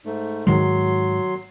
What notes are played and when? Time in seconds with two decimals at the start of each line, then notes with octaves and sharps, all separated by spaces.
0.06 G#2 A3
0.47 G#2 D#3 F#3 G#3 C6